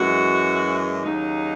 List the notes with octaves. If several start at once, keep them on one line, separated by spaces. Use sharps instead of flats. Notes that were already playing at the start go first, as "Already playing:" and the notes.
Already playing: F#2 E3 G#3 F#4
D#2 C#3 F#3 D#4